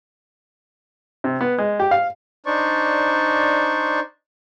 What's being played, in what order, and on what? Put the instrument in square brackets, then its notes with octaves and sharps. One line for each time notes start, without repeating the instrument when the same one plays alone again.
[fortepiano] C3
B3
G#3
G4
F5
[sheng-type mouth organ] D4 D#4 C5 D5 C#6